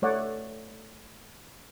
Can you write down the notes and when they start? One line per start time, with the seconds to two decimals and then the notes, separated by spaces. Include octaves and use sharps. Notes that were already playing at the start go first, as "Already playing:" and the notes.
0.02 A3 C#5 D5 F#5